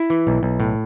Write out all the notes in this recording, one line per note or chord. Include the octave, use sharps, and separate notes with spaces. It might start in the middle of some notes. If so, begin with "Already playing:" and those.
Already playing: E4
E3
B1
B1
A2